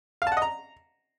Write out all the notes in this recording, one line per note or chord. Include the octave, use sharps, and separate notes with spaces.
F5
A5
F#5
D#5
A#5